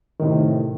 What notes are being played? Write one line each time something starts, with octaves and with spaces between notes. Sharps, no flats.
A2 C3 D#3